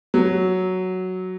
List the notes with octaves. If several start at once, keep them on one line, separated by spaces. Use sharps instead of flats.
F#3